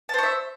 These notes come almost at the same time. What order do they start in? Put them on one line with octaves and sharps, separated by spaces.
A5 C5 C#6 E5